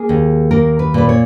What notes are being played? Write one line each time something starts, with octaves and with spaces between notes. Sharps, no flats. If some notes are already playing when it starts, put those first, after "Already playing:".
Already playing: A#3 G#4
D#2
A#3 A#4
B4
A#2 B4
C#5